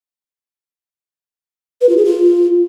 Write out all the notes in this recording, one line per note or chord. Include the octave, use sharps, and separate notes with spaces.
B4
F4
G#4
F4